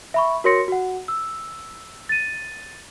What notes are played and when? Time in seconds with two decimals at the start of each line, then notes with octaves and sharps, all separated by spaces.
0.14 E5 B5 C#6
0.44 F#4 A#4 C#5 C6 A#6 C#7
0.68 F#4 F#5
1.08 E6
2.09 A6 D#7